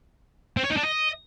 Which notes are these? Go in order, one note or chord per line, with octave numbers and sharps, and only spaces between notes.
C4
C#5
D#4
D4
D#5